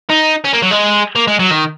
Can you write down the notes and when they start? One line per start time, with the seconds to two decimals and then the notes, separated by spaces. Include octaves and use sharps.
0.10 D#4
0.45 C#4
0.53 A#3
0.62 F#3
0.71 G#3
1.16 A#3
1.28 G#3
1.40 F#3
1.51 D#3